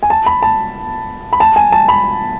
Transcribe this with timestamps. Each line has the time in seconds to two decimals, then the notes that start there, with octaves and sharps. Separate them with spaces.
0.03 G#5
0.10 A5
0.26 B5
0.42 A5
1.33 B5
1.40 A5
1.56 G#5
1.72 A5
1.88 B5